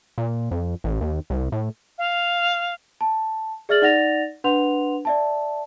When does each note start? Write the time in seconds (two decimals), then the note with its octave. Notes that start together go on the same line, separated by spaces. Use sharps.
0.18 A#2
0.51 F2
0.84 A1
1.01 D#2
1.30 C2
1.52 A2
1.98 F5
3.01 A5
3.69 G#4 D5 E5 F6 A6 F#7
3.82 D#4 D5 F#5 A6 A#6 F7
4.44 D4 B4 F#5 C6 F7
5.05 D5 E5 A5